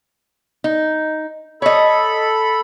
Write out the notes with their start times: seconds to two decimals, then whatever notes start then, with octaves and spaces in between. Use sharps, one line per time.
0.64 D#4
1.62 A4 C#5 D#5 B5